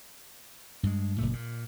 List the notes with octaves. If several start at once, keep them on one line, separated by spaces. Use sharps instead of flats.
G2 G#3
F#1 A#2 A3
A#2